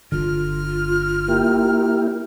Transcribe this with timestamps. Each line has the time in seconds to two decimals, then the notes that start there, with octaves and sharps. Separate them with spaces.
0.12 G1 D3 F4 F6
1.28 A#3 E4 G4